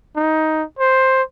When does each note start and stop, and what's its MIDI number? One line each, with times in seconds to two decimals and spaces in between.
0.16 0.63 63
0.79 1.22 72